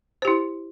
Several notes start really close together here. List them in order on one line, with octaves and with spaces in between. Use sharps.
C5 G4 E4